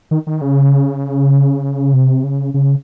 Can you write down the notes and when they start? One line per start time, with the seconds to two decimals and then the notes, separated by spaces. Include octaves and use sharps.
0.11 D#3
0.27 D#3
0.41 C#3
1.93 C3
2.24 C#3
2.54 C#3